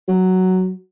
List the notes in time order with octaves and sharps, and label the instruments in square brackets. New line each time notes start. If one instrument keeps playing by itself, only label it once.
[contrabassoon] F#3